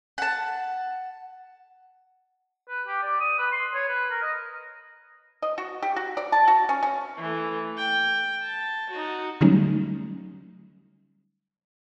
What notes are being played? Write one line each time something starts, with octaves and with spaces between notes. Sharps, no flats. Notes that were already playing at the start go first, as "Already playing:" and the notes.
F#5 A5
B4
G4
D5
D#6
B4
C6
C#5
B4
A#4
D#5
D#5
F#4
G4
F#4
D5
A5
F#4
C#4
C#4
E3 A3
G5
A5
D#4 F#4
D3 F#3 G3 A3 C#4 D#4